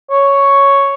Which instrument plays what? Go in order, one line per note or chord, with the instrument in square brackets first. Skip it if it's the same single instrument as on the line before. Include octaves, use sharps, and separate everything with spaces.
[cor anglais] C#5